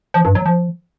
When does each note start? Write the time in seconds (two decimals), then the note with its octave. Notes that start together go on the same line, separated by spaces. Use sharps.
0.14 F3
0.25 G2
0.35 F#3
0.46 F3